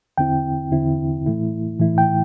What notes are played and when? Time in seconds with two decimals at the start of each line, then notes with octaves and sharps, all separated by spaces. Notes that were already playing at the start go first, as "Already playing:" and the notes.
0.18 E2 D3 C4 E4 G5
0.71 E2 D3 C4 E4
1.26 A2 E3 A3 E4
1.80 A2 E3 A3 E4
1.98 G5